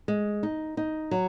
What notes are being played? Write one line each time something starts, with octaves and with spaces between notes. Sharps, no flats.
G#3
D#4
D#4
F#3